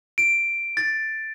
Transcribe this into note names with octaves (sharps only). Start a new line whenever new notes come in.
D7
A6